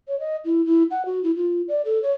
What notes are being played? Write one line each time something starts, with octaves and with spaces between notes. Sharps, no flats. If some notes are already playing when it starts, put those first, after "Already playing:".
C#5
D#5
E4
E4
F#5
F#4
E4
F4
D5
A4
C#5